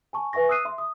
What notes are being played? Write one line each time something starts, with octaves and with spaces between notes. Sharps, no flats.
G#5 A5 C#6
B4 E5 G#5 C#6 A#6
D#6 E6 F#6 C7 D#7
E5 C6
D#6